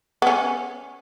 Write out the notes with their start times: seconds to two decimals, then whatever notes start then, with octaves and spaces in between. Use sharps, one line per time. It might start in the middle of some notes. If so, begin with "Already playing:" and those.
0.22 B3 C#4